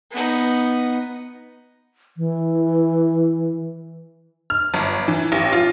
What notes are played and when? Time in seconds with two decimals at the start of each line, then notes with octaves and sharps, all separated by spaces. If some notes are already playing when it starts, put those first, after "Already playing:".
0.11 B3 D#4
2.17 E3
4.50 F6
4.74 G1
5.08 E3
5.32 A1
5.52 F4